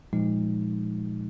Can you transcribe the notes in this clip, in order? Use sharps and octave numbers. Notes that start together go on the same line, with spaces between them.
A#2 F3 G#3 D#4